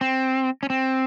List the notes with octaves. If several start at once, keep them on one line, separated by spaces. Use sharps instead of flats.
C4
C#4
C4